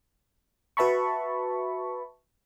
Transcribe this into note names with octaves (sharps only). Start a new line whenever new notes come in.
F#4 B4 E5 A5 B5 C#6